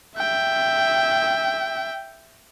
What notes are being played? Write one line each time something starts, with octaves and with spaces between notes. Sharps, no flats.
E5 G5